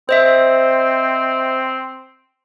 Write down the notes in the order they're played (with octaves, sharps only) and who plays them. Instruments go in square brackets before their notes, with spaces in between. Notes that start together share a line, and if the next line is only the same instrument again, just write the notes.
[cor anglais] C4 [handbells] C5 D#5 E5